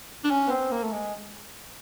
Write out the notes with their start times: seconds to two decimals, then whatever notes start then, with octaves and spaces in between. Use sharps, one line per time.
0.24 D4
0.31 C#4
0.47 B3
0.51 C4
0.72 A#3
0.83 A3
0.92 G#3